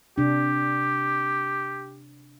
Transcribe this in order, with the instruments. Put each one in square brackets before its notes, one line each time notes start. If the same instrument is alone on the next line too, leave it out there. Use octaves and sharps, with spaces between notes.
[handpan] C3 D4 [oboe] G4